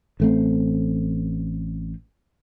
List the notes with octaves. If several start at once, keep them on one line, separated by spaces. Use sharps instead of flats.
A1 A3 C4